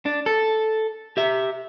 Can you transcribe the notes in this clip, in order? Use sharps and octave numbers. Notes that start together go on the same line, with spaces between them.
D4
A4
G4 E5